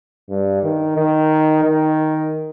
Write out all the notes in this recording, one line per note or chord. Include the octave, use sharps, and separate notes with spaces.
G2
D#3
D#3
D#3